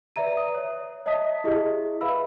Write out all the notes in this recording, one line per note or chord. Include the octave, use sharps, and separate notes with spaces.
B4 D5 E5 A#5 D#7
D#6
C#5
C#5 D#5 E5 A5 D#6 B6
E4 G4 G#4 D#5
B4 E5 F5 B5 E6